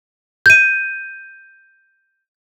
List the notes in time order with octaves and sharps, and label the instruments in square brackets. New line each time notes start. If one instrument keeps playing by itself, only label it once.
[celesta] G6 D#7